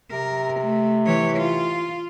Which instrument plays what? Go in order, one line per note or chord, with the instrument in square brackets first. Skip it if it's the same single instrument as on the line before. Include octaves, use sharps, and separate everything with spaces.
[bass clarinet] C3 [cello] A#4
[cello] A3
E3 C#5
F4